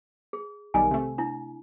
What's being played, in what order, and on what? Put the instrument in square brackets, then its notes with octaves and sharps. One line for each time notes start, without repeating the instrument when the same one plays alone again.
[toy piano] G#4
[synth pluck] B1 D#3 G3 [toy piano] G#5
[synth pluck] C3 A3
[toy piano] D4 E4